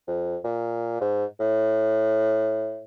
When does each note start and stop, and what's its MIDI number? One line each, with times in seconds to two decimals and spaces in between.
0.08 0.37 41
0.44 0.98 46
1.01 1.25 44
1.40 2.85 45